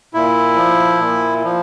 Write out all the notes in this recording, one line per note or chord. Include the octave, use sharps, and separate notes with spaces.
A#2 E4
F3
A#2
F3